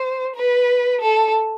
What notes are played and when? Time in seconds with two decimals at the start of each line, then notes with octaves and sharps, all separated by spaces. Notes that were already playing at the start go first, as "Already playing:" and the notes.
Already playing: C5
0.35 B4
1.01 A4